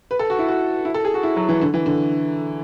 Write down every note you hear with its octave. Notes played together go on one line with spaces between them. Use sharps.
B4
A4
F#4
E4
F#4
E4
A4
G#4
F#4
E4
F#3
E3
D3
E3
D3